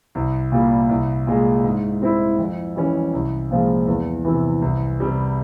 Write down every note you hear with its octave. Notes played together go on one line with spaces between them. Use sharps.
C2
A#2 G3
C2
A#2 G#3
G#2
G3 C4 E4
F2
E3 G3 C#4
C2
A#2 F3 G#3
E2
C3 E3
C2
C3 G3